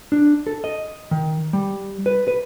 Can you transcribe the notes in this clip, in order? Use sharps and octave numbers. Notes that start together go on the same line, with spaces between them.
D4
A4
D#5
D#3
G3
B4
B4